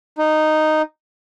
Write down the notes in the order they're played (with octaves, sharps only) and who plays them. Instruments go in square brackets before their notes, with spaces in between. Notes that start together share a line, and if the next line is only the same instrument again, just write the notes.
[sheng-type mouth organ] D#4